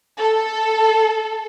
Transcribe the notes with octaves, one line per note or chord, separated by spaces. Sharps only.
A4